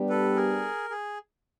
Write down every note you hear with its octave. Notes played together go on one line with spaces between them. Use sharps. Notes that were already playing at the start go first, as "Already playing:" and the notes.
Already playing: G3 B3 D4 G4
A4 B4
G#4 A#4
G#4